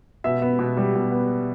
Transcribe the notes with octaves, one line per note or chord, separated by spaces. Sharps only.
B2 E5
B3
B2
G3
B2
B3